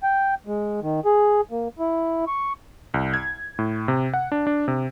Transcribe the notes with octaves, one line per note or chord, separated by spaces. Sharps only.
G5
G#3
D#3
G#4
A#3
E4
C#6
C2
G#6
A2
C3
F#5
D4
D4
C3